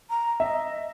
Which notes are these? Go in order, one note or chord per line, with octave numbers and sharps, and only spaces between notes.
A#5
D#5 E5